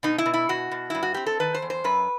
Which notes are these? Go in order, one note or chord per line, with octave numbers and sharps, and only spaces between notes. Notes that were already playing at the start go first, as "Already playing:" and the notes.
B2 D#4
E4
B2
E4
B2 F#4
B2
G2 E4
F#4
C4 G4
A4
D#3 B4
C5
E2
C5
F#2 B4